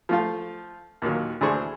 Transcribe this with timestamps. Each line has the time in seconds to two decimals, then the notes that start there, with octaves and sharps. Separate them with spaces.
0.09 F3 A3 F4
1.02 D#2 A#2 D#3 F#3
1.41 D2 E3 D4 G#4 C5 C#6